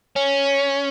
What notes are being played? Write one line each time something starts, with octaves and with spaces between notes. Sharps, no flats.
C#4